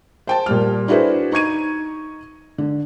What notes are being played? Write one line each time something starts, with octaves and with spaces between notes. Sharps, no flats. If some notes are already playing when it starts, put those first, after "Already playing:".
C5 G5 A5
A#2 G3 F6
D4 E4 F#4 G#4 B4 C5
D#4 C#6 G#6 D#7
D3